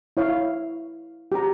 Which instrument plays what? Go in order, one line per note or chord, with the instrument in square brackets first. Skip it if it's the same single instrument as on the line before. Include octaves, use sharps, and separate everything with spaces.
[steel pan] E4 C#5 F5
G4 A#5